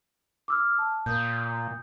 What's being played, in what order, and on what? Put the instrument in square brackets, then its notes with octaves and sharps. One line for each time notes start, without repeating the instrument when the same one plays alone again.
[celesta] D6 E6 F6
A5
[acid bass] A#2 [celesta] D#6 G6